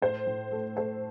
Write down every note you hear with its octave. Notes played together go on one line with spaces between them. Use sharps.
A2 C5
A2
A3
A3 C5